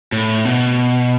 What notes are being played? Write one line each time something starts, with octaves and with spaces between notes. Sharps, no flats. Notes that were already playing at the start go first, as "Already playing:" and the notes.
A2
B2